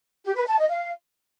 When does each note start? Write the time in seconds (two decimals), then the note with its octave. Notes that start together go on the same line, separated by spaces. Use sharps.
0.24 G4
0.36 B4
0.47 A5
0.58 D#5
0.69 F5